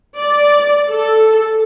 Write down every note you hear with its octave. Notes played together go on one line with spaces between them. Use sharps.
D5
A4